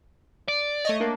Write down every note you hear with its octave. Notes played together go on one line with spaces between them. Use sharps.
D5
A3 C#5 D#5
A#3 D4